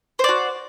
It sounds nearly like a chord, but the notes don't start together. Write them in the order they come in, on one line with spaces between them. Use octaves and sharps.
C5 D5 F#4